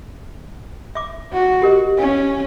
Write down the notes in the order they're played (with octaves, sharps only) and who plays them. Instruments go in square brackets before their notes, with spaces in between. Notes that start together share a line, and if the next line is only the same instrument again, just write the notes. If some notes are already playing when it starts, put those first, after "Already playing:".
[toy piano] E5 D6
[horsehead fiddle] F#4
[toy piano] G4 A#4 D#5
[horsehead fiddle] C#4 [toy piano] F5